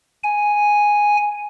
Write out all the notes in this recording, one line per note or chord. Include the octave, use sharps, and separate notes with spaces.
G#5